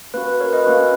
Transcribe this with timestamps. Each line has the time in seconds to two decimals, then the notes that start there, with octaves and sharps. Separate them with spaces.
0.14 A#3 C#4 F#4 B4
0.27 B4
0.40 A#4 C#5
0.53 B4 D#5
0.66 A#3 C#4 F#4